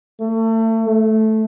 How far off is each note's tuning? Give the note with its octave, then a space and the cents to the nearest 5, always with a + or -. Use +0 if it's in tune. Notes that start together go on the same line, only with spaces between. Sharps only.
A3 +35
A3 -5